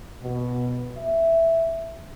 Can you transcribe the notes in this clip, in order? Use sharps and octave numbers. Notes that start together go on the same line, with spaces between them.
B2
E5